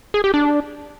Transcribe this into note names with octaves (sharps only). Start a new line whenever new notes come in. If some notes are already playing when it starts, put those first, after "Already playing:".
G#4
G4
D4